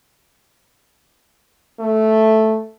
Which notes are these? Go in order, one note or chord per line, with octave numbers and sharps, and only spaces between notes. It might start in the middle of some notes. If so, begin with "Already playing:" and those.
A3